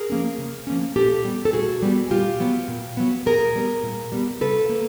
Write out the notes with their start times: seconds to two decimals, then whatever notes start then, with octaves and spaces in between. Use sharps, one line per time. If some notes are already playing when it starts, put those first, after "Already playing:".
Already playing: G#4 A#4
0.10 F3 A#3 C#4
0.38 C#3
0.67 F3 A#3 C#4
0.96 A#2 G4 A4
1.24 G3 B3
1.45 A4
1.53 A#2 F#4 G#4
1.82 G3 B3
2.11 A#2 F4 G4
2.40 F#3 B3
2.68 A#2
2.97 F#3 B3
3.26 A#2 G#4 A#4
3.55 G3 B3
3.83 A#2
4.12 G3 B3
4.41 C#3 A4 B4
4.69 A#3